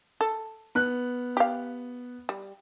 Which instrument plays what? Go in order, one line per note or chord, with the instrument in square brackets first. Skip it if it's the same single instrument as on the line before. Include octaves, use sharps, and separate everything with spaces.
[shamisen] A4
[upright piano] B3 F#6
[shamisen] G4 F5
G3